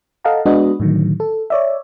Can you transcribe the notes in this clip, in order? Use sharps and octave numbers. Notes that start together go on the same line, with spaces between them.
A4 D#5 F5 F#5 A5 A#5
G#3 B3 D4 F#4 B4 D#5
A2 D3 D#3 F#3
A4
C#5 D5 E5